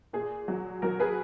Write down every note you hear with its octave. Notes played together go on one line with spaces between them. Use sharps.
A#2 G#4
F#3
F#3 A#4
G#4 B4